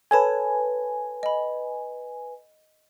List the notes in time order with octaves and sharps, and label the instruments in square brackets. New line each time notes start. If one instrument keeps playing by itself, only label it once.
[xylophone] A4 C#5 A5 [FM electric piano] B4 G#5
[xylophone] D#5 B5